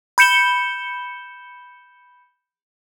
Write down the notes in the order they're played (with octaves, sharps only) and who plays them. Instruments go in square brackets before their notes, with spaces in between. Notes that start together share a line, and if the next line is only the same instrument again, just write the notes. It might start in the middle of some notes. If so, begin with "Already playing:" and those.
[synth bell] B5 G6 C#7 E7 G7